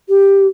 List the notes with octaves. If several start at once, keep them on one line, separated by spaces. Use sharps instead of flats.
G4